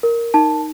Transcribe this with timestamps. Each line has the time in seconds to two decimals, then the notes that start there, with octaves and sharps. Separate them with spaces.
0.03 A#4
0.34 D#4 A5